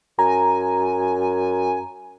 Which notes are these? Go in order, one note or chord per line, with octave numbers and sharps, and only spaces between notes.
F#2 G#5 A#5